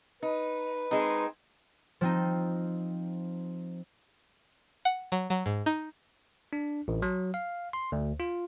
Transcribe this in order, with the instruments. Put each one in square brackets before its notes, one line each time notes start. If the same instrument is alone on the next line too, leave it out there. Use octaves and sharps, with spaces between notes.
[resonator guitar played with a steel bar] D#4 [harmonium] B4
[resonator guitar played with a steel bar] G#3 C4 [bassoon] D#4
[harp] F3 C4 D#4
[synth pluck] F#5
F#3
F#3
G#2
D#4
[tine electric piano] D4
A1
F#3
F5
C6
D2
F4